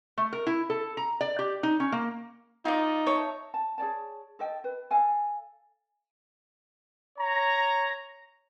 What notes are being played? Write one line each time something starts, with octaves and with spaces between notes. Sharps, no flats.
A3
A#4
E4
A4
A#5
D5
G4
D#4
C#4
A#3
D#4 F4 D5
C#5 E5 A5
A5
G#4 C#5 D5 A5
A4 D#5 G5
B4
A4 F5 G#5
C#5 A#5